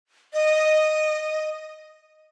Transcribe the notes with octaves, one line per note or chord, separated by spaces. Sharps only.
D#5